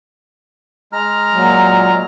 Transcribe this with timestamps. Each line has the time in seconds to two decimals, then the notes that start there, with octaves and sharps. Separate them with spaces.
0.93 G#3 A#5 F6
1.34 A#2 F#3